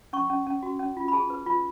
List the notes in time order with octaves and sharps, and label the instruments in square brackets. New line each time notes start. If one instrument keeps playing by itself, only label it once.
[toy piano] C#4 C#6
C#4
C#4
F#4
C#4
F4
B5
G#4 A5
B4
F4